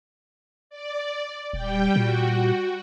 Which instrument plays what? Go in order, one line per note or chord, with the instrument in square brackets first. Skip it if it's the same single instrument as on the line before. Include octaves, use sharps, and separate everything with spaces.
[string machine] D5
[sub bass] D#1 [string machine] G3 G5
[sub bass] A#2 [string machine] F#4